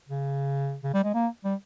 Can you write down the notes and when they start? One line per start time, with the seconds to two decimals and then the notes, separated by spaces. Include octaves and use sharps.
0.09 C#3
0.84 C#3
0.94 G3
1.04 G#3
1.14 A#3
1.44 G3